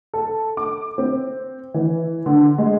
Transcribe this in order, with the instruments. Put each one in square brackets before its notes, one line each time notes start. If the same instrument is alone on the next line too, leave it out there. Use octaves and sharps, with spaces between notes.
[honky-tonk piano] A4
D6
C4
E3
D3
G#3